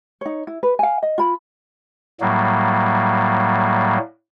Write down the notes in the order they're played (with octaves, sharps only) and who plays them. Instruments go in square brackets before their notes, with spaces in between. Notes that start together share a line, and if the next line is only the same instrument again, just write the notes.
[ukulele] D#4 C#5
E4
B4
F5 G#5
D#5
F4 B5
[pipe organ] A2 F#3 G3 A#3